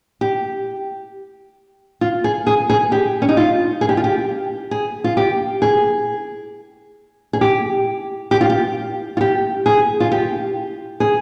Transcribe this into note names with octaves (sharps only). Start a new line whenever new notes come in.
G4
F4
G#4
G#4
G#4
G4
C#4
D#4
F4
G#4
G4
F4
G4
G#4
F4
G4
G#4
G#4
G4
G4
F4
G4
F4
G4
G#4
F4
G4
G#4